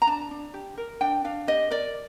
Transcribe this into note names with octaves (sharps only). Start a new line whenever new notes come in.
A#5
D4 A5
D4
G4
A#4
D4 G5
D4 F5
G4 D#5
A#4 D5